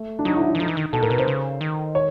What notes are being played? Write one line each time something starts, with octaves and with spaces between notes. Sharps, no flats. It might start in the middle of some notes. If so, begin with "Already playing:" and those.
Already playing: A3
D4
F#3 D#4
E4
E4
E3
F3 D#4
E3
D#3
B2 A4
A2 A#4
B2 B4
C3 C5
C#3
D#3
C#5